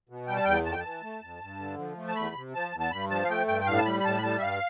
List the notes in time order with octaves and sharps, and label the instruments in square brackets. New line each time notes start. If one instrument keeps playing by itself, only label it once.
[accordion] B2
G3 G5
A5
E2 G5
F2 A5
G5
E3 A5
A3
F2
G2
D3
F3
A3
A5
E2 B5
C3
F3 A5
E2
A5
G2 B5
F3 A5
F5
A3 G5
G2 G5
G5
A2 F5
A5
G3 B5
B5
A2 A5
B5
G3 A5
E5
G2 F5